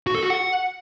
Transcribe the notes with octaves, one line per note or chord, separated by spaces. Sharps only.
F#4
A4
F#4
F#5